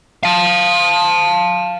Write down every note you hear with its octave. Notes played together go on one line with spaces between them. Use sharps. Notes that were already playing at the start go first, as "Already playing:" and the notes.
F5 A5